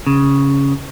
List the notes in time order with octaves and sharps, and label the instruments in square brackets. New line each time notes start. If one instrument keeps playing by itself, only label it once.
[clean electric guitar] C#3